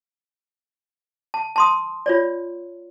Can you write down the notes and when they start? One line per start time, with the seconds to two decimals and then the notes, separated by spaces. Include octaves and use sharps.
1.34 A5
1.56 A5 C6 D#6
2.06 F4 C#5 D5